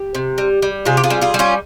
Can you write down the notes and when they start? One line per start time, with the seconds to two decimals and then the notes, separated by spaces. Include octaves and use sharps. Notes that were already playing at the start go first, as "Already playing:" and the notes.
Already playing: G4
0.15 C3
0.38 G3
0.62 G3
0.85 C3 F4 G#4
0.97 G4
1.04 F4 G#4
1.10 G3
1.21 F4 G#4
1.34 G3
1.39 C#4 F4